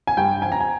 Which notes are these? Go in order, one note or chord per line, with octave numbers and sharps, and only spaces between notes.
G#5
G2 G5
F3 G#5
A#5
G#5